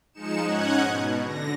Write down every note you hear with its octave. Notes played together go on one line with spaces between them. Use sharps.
F3 G#3 D#4 C#7 E7
G#2 C#4 D#4 F#5 F#6 G#6
B2
D3 A#6